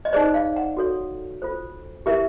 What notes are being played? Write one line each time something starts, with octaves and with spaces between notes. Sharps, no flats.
D#5
D#4 G#4 C5 D5
F5
F#5
F#4 A4 C#5
F4 A4 C5
E4 G4 A#4 E5